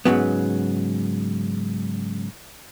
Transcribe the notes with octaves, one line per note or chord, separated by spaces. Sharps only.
G#2 C#3 F#3 B3